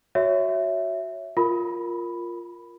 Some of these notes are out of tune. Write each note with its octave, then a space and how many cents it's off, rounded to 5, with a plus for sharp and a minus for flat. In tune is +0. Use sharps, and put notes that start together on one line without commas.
F#4 +0 C#5 +10 E5 +0
F4 +0 A#4 +0 B5 +0